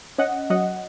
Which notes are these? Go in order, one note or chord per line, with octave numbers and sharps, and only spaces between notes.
C#4 D#5 F#5
F#3 D#5 F#5